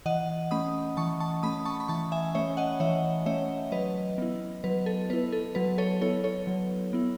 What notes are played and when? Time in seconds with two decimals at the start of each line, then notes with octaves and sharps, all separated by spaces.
0.06 E3 D#5 F#5
0.51 A3 C#4 B5 D#6
0.97 E3 A5 C#6
1.20 A5 C#6
1.43 A3 C#4 B5 D#6
1.65 A5 C#6
1.80 B5
1.88 E3 A5 C#6
2.12 E5 G#5
2.35 A3 C#4 C#5 E5
2.57 D#5 F#5
2.80 E3 C#5 E5
3.26 A3 C#4 C#5 E5
3.72 F#3 B4 D#5
4.18 B3 E4
4.64 F#3 B4
4.86 A4
5.10 B3 E4 B4
5.32 A4
5.55 F#3 B4
5.78 A4 C#5
6.01 B3 E4 A4 C#5
6.24 A4 C#5
6.47 F#3
6.93 B3 E4